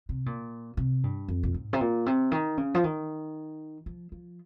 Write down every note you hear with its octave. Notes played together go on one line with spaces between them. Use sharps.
C3
A#2
C3
G2
F2
A#2
G#2
C3
A#2
C3
D#3
C#3
F3
D#3
F3
F3